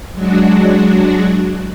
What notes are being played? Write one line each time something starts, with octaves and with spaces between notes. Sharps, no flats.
F#3 G#3 D4 F#4